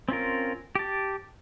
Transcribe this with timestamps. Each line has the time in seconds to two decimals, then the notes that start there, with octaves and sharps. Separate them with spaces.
0.09 C4 C#4 F4 A#4
0.75 G4 A5